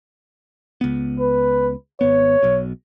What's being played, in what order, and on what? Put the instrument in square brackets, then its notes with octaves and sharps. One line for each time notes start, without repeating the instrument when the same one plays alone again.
[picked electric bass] C#2 B3
[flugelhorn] B4
[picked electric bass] G#1 B3 [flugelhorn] C#5
[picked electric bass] B1 B2